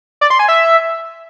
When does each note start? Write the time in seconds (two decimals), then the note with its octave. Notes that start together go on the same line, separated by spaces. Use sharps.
0.21 D5
0.30 C6
0.39 G#5
0.48 E5